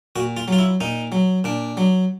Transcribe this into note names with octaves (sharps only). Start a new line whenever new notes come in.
A#2 F#4
F4
F#3 F4
E4
A#2 D#4
F#3
A#2 D4
F#3